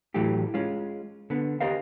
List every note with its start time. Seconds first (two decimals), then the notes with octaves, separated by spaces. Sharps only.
0.14 A2 E3 F#3 A3 G4
0.54 G#3 C#4 F4
1.30 D3 B3
1.60 G4 A#4 C5 D#5 F5